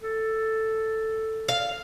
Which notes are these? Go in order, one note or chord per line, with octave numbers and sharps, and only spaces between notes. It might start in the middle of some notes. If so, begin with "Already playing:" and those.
A4
F5